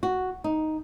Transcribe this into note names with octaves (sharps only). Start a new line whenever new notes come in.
F#4
D#4